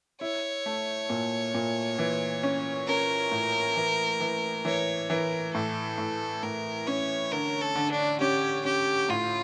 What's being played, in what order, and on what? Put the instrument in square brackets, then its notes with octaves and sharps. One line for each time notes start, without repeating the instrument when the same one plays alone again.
[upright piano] E4 [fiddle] C#5
[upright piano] A3
A#2
A#2
E3
C#4
[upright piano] C#4 [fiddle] A#4
[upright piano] A2
E3
E3
[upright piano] E3 [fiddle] C#5
[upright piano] E3 [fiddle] A#4
[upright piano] A2 [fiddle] A4
[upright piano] A2
[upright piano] A2 [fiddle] A#4
[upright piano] C#4 [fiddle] C#5
[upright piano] D3 [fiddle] A#4
[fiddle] A4
[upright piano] D3
[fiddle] D4
[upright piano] C#4 [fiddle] G4
[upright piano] C#4 [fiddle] G4
[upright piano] A2 [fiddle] F4